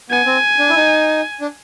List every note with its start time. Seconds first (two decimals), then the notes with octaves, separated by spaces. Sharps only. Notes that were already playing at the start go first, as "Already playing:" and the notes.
0.10 B3 G#5
0.26 C4
0.59 D4
0.69 E4
0.76 D#4
1.41 D4